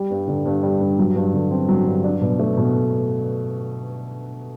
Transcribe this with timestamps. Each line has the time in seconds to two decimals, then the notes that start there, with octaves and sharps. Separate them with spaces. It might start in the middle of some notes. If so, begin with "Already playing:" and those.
Already playing: G3
0.10 G2
0.28 D3
0.45 G2
0.63 G3
0.81 G2
0.98 F#3
1.16 G2
1.33 D3
1.51 C4
1.69 F#3
1.86 G2
2.04 D4
2.22 B2
2.39 A3
2.57 B2